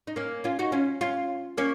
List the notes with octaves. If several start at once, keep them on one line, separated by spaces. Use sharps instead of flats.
D#4
A#3 C#4
C#4 F4
D#4 F#4
C#4 F4
C#4 F4
A#3 C#4